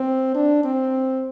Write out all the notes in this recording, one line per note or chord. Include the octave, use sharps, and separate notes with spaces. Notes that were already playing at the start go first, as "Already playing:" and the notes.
Already playing: C4
D4
C4